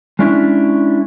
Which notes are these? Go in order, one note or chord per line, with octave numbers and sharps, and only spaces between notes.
G#3 C#4 D4 E4